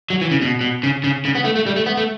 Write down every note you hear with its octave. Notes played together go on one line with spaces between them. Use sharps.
F#3
E3
C#3
B2
B2
C#3
C#3
C#3
B3
A3
A3
G3
A3
B3
A3